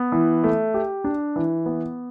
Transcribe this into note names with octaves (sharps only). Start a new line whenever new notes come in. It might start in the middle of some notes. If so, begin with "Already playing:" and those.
Already playing: B3
E3
A3
G4
D4
E3
B3